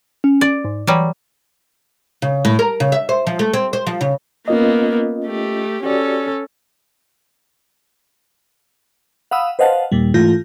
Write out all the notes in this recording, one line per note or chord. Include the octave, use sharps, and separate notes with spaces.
C#4
D5
G#2
E3 F#3 G3
C#3
A2
A#4
C#3
E5
C5
F3
A3
C4
C5
F3
C#3
A#3 B3 C#4 F4 D#5
A3 G4
C#4 F#4 G4 A4 D5
F5 F#5 B5 D#6 E6
B4 C5 D#5 F5 F#5 A5
D#2 A#2 G3
G#2 E3 A3 F4 G6 A#6